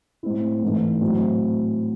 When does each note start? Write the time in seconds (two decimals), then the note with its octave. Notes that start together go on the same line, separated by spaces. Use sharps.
0.23 A2 G#3 C4 E4
0.62 G#2 E3 A3 D#4
1.01 A2 F#3 C4